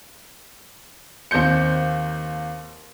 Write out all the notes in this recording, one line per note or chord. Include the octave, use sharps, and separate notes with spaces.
D#2 C4 C5 G6 C#7